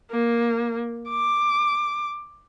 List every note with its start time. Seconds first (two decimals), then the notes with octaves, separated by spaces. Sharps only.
0.11 A#3
1.09 D6